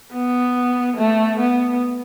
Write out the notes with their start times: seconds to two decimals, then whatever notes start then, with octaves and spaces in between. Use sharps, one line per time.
0.13 B3
0.97 A3
1.39 B3